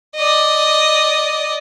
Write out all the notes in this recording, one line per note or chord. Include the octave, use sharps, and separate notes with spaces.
D5 D#5